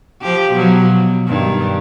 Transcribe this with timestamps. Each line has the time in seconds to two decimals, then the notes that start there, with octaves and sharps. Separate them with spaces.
0.21 F3 G4
0.52 B2 F3 F#3
0.90 B2
1.26 G2 D#3